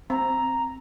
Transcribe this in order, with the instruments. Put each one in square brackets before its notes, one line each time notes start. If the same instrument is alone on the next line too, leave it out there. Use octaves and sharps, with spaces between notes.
[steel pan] C4 [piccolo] A#5